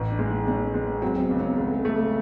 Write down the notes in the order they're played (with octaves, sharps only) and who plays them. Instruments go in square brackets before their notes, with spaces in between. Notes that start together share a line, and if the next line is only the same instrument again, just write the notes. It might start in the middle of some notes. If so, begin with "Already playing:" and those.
Already playing: [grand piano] A1
[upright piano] D4
[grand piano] G#3
[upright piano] D#4
[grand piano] G#3 [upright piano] C#4
[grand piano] G#3 [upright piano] C#4
[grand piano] F#3 [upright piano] C4
[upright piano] C4
B3
[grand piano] C#2
[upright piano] C#4
[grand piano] C#2 [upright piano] G#3
[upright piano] A3
G#3
[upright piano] G#3 [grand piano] A3